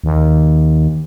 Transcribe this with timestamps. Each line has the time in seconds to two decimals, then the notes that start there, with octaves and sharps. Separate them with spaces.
0.04 D#2